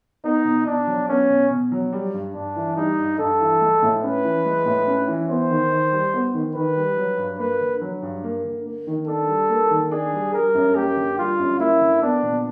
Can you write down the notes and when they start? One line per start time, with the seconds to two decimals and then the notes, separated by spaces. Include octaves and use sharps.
0.24 B3 D#4
0.45 B2
0.66 B2 D4
0.87 F#3
1.08 B3 C#4
1.30 B2
1.50 B2
1.72 F#3
1.93 G3
2.14 G2
2.34 G2 D4
2.56 E3
2.76 G3 D#4
2.98 G2
3.19 G2 A4
3.40 E3
3.61 G#3
3.82 A2
4.03 C#4 B4
4.24 E3
4.45 G#3
4.66 A2
4.87 C#4
5.08 E3
5.29 B3 C5
5.50 D#3
5.71 D#3
5.92 G3
6.14 B3
6.34 D#3
6.55 D#3 B4
6.77 G3
6.97 F#3
7.18 G2
7.39 A#3 B4
7.61 D3
7.81 F#3
8.02 G2
8.24 A#3
8.44 D3
8.66 A#3
8.87 D#3
9.07 D4 A4
9.28 G3
9.49 A#3
9.70 D#3
9.91 D4 G#4
10.13 G3
10.34 G3 A#4
10.54 F#2
10.75 A#3 G4
10.96 D3
11.18 G3 F4
11.39 F#2
11.60 A#3 E4
11.80 D3
12.02 B3 D4
12.23 A#2